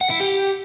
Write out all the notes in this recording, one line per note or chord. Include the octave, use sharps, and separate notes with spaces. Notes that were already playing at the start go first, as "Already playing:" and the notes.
F#5
E4
G4